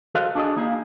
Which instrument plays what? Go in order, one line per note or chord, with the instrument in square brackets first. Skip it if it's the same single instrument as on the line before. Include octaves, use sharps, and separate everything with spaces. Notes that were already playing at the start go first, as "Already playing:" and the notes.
[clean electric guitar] F#4 A4 C5 D#5 F5
D4 F#4 G#4 C5 D5 D#5
A#3 D#4 E4 G4 F5 A#5